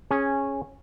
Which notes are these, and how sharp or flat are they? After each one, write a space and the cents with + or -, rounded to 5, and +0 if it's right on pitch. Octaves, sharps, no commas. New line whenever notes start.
C#4 -10 G#4 +0